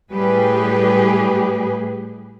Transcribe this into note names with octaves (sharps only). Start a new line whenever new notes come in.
A2 G3 G4 G#4 B4